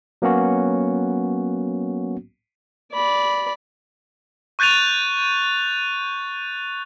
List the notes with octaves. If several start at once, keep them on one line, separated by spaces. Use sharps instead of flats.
F#3 A#3 B3 C#4 F#4
D5 B5
C#6 F#6 G6 A6 D#7 F7